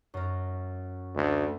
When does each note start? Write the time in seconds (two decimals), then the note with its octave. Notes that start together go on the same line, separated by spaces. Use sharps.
0.14 F#2 A#4
1.16 D2